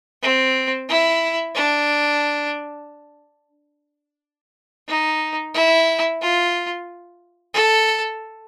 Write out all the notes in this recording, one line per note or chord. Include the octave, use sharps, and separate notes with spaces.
C4
E4
D4
D#4
E4
F4
A4